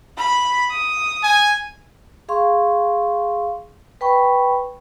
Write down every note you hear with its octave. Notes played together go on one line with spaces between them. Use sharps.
B5
D#6
G#5
G#4 F5 C6 C#6
B4 G5 B5 C#6